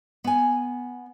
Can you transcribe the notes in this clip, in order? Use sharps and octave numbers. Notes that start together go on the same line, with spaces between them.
B3 G#5